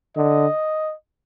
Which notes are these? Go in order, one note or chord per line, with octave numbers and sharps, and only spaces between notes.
D3 D#5